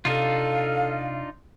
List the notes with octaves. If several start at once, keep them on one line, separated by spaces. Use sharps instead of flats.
C3 D4 D#4 F4 A4 F5